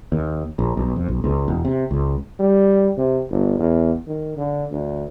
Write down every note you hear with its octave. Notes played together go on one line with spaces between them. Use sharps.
D#2
A#1
B1
F2
B1
C#2
E1
C3
C#2
G3
C3
G1
E2
D#3
D3
D2